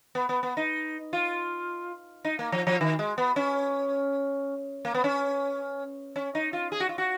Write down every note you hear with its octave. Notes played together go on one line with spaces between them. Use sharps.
B3
B3
B3
D#4
F4
D#4
A#3
F3
F3
D#3
G#3
B3
C#4
A#3
B3
C#4
C#4
D#4
F4
G#4
F#4
F4
F#4